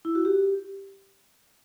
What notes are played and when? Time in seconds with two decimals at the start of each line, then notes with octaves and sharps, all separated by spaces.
0.05 E4
0.15 F#4
0.25 G4